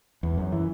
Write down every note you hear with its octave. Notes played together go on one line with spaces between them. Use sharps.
E2
F#2
E3